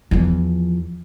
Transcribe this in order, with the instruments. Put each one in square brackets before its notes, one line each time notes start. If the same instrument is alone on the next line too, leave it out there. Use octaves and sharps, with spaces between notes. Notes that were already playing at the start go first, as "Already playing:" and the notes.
[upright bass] E2 F3